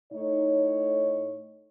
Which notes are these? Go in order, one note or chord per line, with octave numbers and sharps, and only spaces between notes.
A2 D#4 C#5